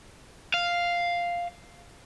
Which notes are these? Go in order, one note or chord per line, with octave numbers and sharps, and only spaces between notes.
F5